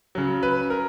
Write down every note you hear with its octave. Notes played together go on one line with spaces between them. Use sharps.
C#3 F#3
B4
A#4